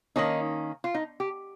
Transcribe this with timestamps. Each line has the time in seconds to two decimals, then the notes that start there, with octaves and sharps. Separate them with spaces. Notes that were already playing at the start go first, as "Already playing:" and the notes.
0.16 D#3 A#3 C#4 D#4
0.84 F4
0.95 D#4
1.20 G4